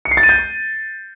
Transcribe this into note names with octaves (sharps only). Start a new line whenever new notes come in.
C#7
C7
A6
D#7
G6